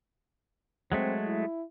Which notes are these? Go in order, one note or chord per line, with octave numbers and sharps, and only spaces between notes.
F#3 G#3 A3 C4
E4